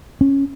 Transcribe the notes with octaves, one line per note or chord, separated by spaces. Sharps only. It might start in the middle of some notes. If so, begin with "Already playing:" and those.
C#4